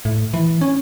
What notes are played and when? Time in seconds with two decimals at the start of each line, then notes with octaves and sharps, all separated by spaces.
0.05 A2
0.34 E3
0.61 C#4